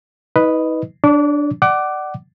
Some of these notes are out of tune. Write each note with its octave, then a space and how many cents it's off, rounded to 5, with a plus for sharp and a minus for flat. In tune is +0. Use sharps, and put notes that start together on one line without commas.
D#4 +45 B4 +0 D#5 -5
D4 +0 C#5 +35 D6 -30
D5 +20 F#5 +25 D6 +0